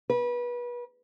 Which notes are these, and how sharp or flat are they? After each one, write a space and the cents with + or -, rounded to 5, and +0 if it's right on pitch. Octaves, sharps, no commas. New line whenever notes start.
B4 -30